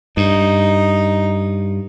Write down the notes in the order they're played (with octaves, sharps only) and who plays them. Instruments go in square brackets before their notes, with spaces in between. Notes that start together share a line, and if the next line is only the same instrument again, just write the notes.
[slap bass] G2 [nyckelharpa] D#4